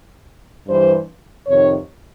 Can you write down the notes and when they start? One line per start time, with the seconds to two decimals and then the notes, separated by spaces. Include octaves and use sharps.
0.67 G2 E3 G3 C5
1.47 F2 C3 D#3 C#5